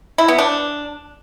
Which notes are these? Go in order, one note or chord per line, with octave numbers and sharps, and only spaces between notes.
E4
B3
D4